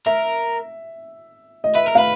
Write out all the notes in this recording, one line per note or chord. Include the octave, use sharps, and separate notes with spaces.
A#4 E5
D#5
B4 E5
A#4
B4 F5